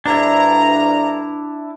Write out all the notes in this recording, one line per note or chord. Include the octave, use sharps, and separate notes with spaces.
D2 G2 D4 E4 A#5